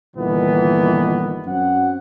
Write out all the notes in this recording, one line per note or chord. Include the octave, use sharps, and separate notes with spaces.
G1 A#2 D#3 E3 B3
F#2 C4 F#4 F#5